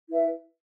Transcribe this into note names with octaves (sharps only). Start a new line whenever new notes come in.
E4 B4 E5